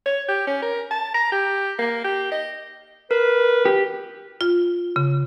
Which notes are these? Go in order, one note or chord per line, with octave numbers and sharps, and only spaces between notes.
C#5
G4
C#4
A#4
A5
A#5
G4
A#3
G4
D#5
A#4 B4
G4
F4
C#3